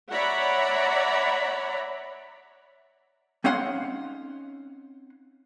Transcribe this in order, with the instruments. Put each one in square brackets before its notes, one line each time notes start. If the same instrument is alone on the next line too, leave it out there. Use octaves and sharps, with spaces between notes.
[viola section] C#5 D5 E5 F#5 A#5 B5
[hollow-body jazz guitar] C4 C#4 D#4 F5 F#5 C6